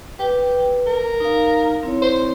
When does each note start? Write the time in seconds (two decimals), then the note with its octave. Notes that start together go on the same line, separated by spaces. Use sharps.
0.19 G4 B4
0.87 A#4
1.20 D#4 F5
1.83 C4 E4 C#5
2.02 C5